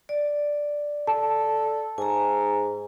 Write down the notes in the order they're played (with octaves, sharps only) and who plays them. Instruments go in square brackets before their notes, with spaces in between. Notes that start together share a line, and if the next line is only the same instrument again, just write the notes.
[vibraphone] D5
[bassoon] A4 [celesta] A5
[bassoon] G#2 [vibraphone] G#5 A#5